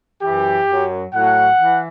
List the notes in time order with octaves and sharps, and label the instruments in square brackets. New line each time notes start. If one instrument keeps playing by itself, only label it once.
[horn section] F#2 E3 G4
F#2 F#3
A2 F#3 F#5
E3